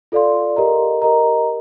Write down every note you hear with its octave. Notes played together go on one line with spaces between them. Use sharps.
F4 A4 D5 F5 C6
G4 A#4 D#5 A#5
G4 A#4 D#5 A#5